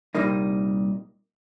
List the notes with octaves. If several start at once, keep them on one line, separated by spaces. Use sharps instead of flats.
C2 A#2 G3 A#3 D#4